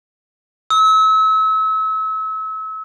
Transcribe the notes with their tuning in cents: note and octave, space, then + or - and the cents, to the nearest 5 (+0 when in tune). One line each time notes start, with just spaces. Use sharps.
E6 -35